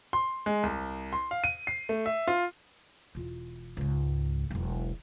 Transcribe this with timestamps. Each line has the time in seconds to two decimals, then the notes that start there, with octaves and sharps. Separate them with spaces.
0.13 C6
0.46 G#3
0.63 C2
1.13 C6
1.31 F5
1.44 D#7
1.67 C7
1.89 A3
2.06 E5
2.28 F4
3.15 E1 F4
3.77 C#2 G#2
4.51 E1 B1